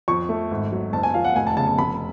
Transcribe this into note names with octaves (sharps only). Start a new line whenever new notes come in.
F2 C#6
A3
G#1
F#3
F#1 A5
G#5
F3 F5
F#5
F1 G#5
A5
C#3 A5
A5
F1 B5